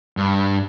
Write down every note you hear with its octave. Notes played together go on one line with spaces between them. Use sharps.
G2